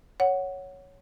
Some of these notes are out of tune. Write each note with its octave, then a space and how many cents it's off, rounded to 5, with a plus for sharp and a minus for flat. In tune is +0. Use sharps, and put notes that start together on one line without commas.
C#5 +0 F#5 +0